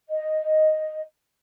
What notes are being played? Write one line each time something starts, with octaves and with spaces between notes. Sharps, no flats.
D#5